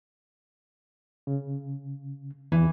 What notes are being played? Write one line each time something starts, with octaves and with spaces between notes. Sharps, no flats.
C#3
E2 E3